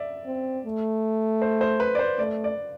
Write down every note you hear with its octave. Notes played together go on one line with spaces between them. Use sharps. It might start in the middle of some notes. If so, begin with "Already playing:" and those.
Already playing: D5 E5
C4
A3
C5
C5
B4
D5
C5
A3 D5
D5